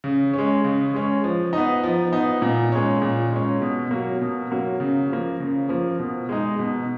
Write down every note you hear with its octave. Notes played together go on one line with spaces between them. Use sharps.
C#3
G#3 C#4
C#3
G#3 C#4
F3
B3 D#4
F3
B3 D#4
A#2
G#3 C#4
A#2
G#3 C#4
B2
F#3 A#3
B2
F#3 A#3
C#3
F3 A#3
C#3
F3 A#3
B2
G#3 D#4
B2